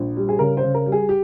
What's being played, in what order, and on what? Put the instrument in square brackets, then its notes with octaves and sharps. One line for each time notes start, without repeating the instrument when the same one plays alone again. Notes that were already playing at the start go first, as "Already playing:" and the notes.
Already playing: [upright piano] A#1
G3
G#4
C#3 A#4
C5
C#3
A#4
G3
G#4
G4